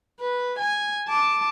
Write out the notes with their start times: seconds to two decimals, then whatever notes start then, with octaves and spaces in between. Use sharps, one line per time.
0.20 B4
0.59 G#5
1.08 A5 D6